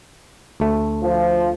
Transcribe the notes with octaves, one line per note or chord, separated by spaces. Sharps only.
D2 A3
F3